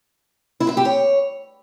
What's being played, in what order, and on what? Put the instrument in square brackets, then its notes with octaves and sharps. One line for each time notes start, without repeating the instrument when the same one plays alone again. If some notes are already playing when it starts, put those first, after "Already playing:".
[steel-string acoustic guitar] E4
E5
G4
C#5